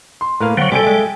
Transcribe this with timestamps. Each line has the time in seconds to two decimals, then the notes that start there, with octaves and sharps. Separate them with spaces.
0.21 C6
0.40 A2 A#3 A#4 B4 F5
0.57 D3 F#3 G3 C4 C#5 F5 F#5
0.72 C3 G3 A4 D5 G5 G#5 D7
0.84 G#3 E5